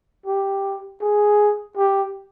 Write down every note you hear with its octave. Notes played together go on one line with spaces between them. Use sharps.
G4
G#4
G4